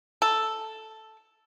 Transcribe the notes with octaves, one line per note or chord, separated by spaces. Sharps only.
A4